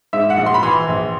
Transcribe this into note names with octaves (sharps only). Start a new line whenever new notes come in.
G#2 E5
F#5
A#1
C6
B5
E3 C6
A#1